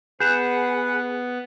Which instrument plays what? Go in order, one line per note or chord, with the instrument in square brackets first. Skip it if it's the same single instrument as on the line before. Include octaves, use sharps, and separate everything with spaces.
[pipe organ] B3 [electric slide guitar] G#4 [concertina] B4 F#5 [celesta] G6 E7